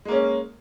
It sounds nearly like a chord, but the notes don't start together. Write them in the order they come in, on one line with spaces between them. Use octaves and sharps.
G#3 A#3 C#4